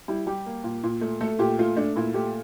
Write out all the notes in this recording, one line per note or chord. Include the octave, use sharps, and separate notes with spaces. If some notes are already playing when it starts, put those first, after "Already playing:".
G3 E4
G3 G4
A#3
A#2
A#2
A3
A3 A4
A#2 G4
A3 F4
A3 D4
A#2 E4
A3 G4